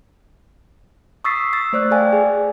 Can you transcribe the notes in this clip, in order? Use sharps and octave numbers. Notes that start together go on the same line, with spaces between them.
C#6 D#6 E6 A6 B6 C7
E6 A6
A3 C5 D5 F#6
A4 D5 F5 G5 G#5
G#4